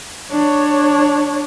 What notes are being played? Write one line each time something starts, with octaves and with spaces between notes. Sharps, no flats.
D4 C#5